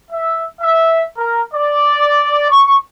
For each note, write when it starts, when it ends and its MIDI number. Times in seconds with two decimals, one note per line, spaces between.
0.11 0.43 76
0.61 1.04 76
1.17 1.41 70
1.54 2.49 74
2.50 2.75 85